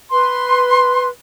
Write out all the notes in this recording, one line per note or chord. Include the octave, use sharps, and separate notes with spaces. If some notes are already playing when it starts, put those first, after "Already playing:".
B4 C6